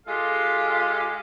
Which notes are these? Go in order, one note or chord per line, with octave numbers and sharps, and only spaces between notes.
G#3 F4 G4 A4 F5